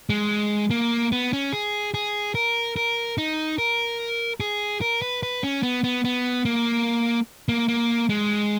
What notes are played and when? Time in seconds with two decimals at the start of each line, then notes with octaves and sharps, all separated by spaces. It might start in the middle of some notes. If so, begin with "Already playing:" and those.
0.10 G#3
0.71 A#3
1.12 B3
1.33 C#4
1.53 G#4
1.94 G#4
2.35 A#4
2.76 A#4
3.18 D#4
3.58 A#4
4.40 G#4
4.81 A#4
5.02 B4
5.23 B4
5.43 C#4
5.63 B3
5.84 B3
6.04 B3
6.45 A#3
7.49 A#3
7.68 A#3
8.09 G#3